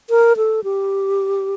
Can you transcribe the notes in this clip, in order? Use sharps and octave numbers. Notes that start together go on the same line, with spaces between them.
A#4
A4
G4